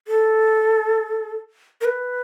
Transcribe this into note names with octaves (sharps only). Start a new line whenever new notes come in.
A4
A#4
B4